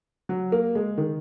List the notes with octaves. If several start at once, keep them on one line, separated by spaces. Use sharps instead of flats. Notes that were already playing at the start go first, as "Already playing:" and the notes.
F#3
A#3
G#3
D#3